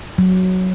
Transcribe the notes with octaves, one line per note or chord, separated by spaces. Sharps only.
F#3